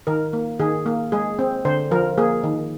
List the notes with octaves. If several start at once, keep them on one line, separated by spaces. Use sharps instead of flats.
D#3 A#4
A#3
D#3 G#4
A#3
G#3 G#4
C4
D3 C5
F3 A#4
A#3 G#4
D#3